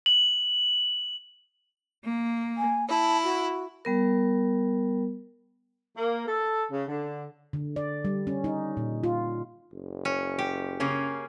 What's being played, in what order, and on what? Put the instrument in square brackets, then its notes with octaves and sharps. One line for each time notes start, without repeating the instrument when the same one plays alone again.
[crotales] F#7
[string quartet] A#3
[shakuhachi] G#5
[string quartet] E4 [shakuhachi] A5
[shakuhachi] F#4
[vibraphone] G3 B3 A#4
[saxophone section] A#3
A4
C#3
D3
[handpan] D3
D5
G3
C#4
D#4
A#2
F4
[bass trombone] F#1
[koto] C#4
G4
[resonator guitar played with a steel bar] C#3 A#3 C#4